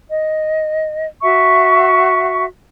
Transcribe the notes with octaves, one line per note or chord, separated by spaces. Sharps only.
D#5
F#4 E5 C#6